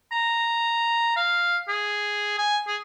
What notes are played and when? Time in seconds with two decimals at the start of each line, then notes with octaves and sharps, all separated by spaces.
0.12 A#5
1.16 F5
1.68 G#4
2.38 G#5
2.67 G#4